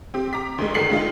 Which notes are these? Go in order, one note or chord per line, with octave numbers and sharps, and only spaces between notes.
C4 G4
A#5 D6 B6
D2 D#3 G#3
G1 D#3 A4 C7 C#7 F#7
D3 G#3 F4